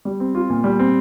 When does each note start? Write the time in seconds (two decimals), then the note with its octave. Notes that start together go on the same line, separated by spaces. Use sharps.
0.05 G3
0.20 C4
0.35 F4
0.50 A#2
0.64 G3
0.79 C4